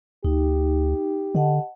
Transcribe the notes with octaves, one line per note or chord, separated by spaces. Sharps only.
D2 D#4 G4
D3 D#5 F#5 A5